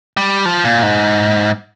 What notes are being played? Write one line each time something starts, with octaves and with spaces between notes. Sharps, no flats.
G3
F3
A#2
G#2